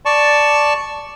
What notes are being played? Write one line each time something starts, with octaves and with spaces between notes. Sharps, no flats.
D5 A5 C#6